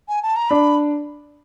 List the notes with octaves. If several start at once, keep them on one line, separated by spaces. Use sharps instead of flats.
G#5
A5
A#5
D4 B5